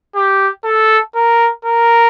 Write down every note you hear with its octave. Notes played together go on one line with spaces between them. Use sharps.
G4
A4
A#4
A#4